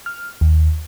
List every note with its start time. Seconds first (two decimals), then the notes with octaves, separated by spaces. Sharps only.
0.06 F6
0.41 D#2